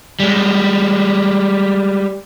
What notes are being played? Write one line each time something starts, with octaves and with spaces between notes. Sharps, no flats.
G3 G#3